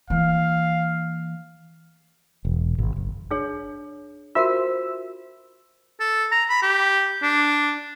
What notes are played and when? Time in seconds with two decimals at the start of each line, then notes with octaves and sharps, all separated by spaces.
0.10 E3 A#3 F5
2.45 E1
2.78 G#1
2.96 F#1
3.31 D4 G#4 C#5
4.35 F4 F#4 A#4 C5 E5 E6
6.00 A4
6.32 A#5
6.50 B5
6.62 G4
7.23 D4